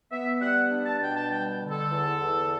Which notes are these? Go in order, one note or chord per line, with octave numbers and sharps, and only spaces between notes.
B3 E5
G3 F#5
D4
A5
B2 G5
A5
G3 G5
D3
A4
E2
E2